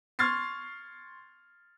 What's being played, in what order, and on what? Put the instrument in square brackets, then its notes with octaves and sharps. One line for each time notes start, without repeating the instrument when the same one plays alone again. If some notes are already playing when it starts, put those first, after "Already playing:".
[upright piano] C6 C#6 F6 G#6 A6 C7